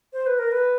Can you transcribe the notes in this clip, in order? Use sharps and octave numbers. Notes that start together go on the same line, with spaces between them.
C5
B4
A#4
B4